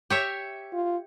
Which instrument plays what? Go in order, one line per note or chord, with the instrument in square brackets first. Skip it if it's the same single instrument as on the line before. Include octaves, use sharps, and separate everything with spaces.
[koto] G4 C#5 E5
[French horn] F4